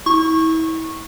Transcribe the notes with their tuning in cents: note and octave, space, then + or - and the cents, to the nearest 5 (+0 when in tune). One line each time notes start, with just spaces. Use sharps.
E4 -35 C#6 -15